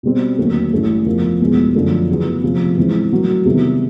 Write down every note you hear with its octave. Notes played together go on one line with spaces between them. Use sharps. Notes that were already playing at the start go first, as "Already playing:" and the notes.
B2 G3 C4
D#2 D3 F#3 A3
A1 G2 E3 A3 C#4
F1 E2 C#3 F3 A#3
F1 E2 B2 G#3 B3
F#2 D3 F3 A3 C#4
E2 C#3 F#3 B3
D2 C3 F3
G#2 E3 G#3 C4
A2 F#3 A#3
E2 C3 D#3 G3 B3